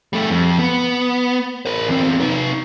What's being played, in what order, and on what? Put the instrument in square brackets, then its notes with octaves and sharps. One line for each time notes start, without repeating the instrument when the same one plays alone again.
[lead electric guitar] G3 A3
F2
B3
A#4 C5
E2 C4
D#4 B4